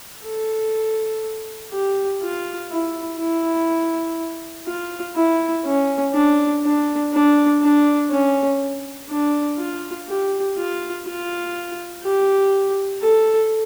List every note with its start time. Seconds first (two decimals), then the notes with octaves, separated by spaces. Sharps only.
0.24 A4
1.72 G4
2.22 F4
2.70 E4
3.19 E4
4.67 F4
5.16 E4
5.65 C#4
6.14 D4
6.63 D4
7.13 D4
7.62 D4
8.10 C#4
9.09 D4
9.58 F4
10.08 G4
10.57 F4
11.06 F4
12.03 G4
13.02 A4